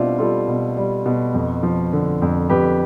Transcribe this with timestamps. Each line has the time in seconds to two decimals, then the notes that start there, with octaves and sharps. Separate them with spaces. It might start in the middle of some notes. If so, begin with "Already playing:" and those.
Already playing: B2 G3 C4 D4 E4 F4
0.19 G3 F4 A4
0.48 B2
0.77 G3
1.06 B2
1.34 F2
1.63 F3
1.93 D3
2.22 F2
2.49 F2 G4 B4